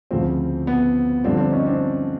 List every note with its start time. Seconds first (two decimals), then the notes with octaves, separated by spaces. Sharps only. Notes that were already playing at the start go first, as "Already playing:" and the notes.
0.11 D2 C#3 F3 C4
0.67 B3
1.24 G2 D3 F3 C4
1.37 C4 D4
1.51 C#4 D#4
1.66 C4 D4